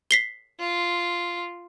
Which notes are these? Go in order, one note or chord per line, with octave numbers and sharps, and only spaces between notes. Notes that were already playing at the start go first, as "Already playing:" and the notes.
B6 C7 G7
F4